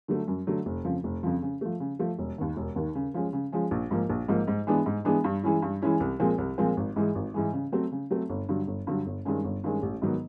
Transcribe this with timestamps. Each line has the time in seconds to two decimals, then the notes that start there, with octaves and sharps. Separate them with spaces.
0.08 D3 F#3 A3
0.28 F#2
0.47 D3 F#3 A3
0.66 F1
0.85 F2 C#3 F3
1.04 F1
1.23 F2 C#3 F3
1.42 C#3
1.61 F3 A3
1.80 C#3
1.99 F3 A3
2.19 E1
2.38 D#2 D#3
2.57 E1
2.76 D#2 D#3
2.95 C#3
3.14 F3 G#3 C#4
3.33 C#3
3.52 F3 G#3 C#4
3.71 A#1
3.91 G#2 F3 A#3
4.10 A#1
4.28 G#2 F3 A#3
4.47 G#2
4.67 E3 G#3 B3 D4
4.86 G#2
5.05 E3 G#3 B3 D4
5.24 G2
5.43 E3 G#3 C#4 E4
5.62 G2
5.82 E3 G#3 C#4 E4
6.00 C2
6.20 A#2 F3 G#3 C4
6.38 C2
6.58 A#2 F3 G#3 C4
6.77 G#1
6.96 G#2 E3 G#3
7.15 G#1
7.34 G#2 E3 G#3
7.53 C#3
7.72 F#3 A3 C4
7.92 C#3
8.11 F#3 A3 C4
8.30 G1
8.49 G2 D3 F#3
8.67 G1
8.87 G2 D3 F#3
9.06 G1
9.25 G2 D#3 G#3 C#4
9.44 G1
9.64 G2 D#3 G#3 C#4
9.83 A1
10.02 G#2 D#3 F#3 B3